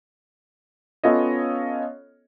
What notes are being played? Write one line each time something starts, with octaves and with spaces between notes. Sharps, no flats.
B3 C#4 F4 A4 C#5 D#5